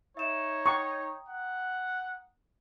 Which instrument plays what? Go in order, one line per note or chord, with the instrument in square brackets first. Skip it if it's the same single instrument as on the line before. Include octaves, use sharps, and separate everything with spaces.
[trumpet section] D#4 C#5 [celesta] E5 E7
[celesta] G5 A#5 D#6 [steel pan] C#6
[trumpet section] F#5